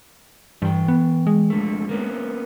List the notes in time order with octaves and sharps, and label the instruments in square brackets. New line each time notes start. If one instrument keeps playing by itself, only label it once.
[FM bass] G2 [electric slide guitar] E3 G5
[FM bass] B3
G#3
[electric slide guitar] F2 D3 A3
A#3 B3 C#4